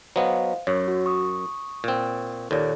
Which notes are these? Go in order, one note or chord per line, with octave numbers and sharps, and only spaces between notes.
F#3 B3 C5 D#5 F5
F#2 C#5
F#4
C#6 D#6
A#2 C4
D#2 A#2 A4 C#5 D5